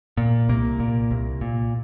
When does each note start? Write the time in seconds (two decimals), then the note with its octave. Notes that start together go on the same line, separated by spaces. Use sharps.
0.17 A#2
0.49 C2 A#3
0.80 A#2
1.11 C2
1.41 A#2